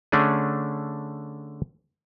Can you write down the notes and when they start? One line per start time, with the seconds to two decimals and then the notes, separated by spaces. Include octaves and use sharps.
0.12 D3 A3 C#4 D4 G#4